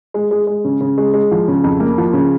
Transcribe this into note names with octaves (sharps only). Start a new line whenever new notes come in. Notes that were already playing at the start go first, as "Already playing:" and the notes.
G#3
G#3
G#3
C#3
C#3
G#3
G#3
F3
C#3
F2
A#3
F3
C#3